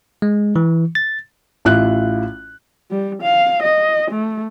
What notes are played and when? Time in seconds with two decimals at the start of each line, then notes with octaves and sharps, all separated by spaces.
0.22 G#3
0.56 E3
0.95 A6
1.65 A1 E4 F4 F#6
2.91 G3
3.22 F5
3.63 D#5
4.11 A3